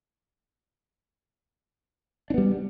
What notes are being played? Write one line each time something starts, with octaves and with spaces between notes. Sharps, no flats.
G3 B3 D4